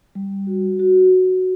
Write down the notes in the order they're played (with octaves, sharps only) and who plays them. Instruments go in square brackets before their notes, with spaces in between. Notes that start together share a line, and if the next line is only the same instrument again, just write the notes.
[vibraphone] G3
F#4
F#4
F#4